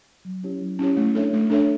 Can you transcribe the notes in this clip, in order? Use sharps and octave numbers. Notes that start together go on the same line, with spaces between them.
F#3
C#4 E4 G4 C#5
F#3
C#4 E4 G4 C#5
A3
D4 A4 C#5 E5
A3
D4 A4 C#5 E5